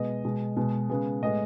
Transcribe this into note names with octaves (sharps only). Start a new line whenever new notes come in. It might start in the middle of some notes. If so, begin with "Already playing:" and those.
Already playing: B2 G#3 B3 D#5
B2 G#3 B3
B2 G#3 B3
C#3 G#3 B3
A2 G#3 B3 D#5